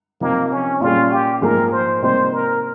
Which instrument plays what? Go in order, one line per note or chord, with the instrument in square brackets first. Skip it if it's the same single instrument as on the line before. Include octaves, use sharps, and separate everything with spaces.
[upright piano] C3 F3 C4 D#4 [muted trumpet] A#3
[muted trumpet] C#4
[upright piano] A#2 G3 C#4 G#4 [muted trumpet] F4
[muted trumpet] G4
[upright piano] G#2 F3 A#3 F4 G#4 [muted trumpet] A#4
[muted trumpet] C5
[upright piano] C3 G3 A#3 D#4 G4 [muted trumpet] C5
[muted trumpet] A#4